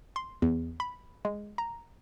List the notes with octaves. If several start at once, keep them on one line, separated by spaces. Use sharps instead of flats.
C6
E2
B5
G#3
A#5